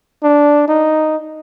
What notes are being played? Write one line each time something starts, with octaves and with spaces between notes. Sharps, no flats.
D4
D#4